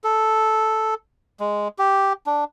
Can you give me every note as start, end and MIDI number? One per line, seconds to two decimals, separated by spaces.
0.04 0.94 69
1.40 1.68 56
1.78 2.13 67
2.26 2.44 62